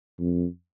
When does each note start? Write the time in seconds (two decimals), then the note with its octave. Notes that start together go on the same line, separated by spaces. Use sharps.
0.19 F2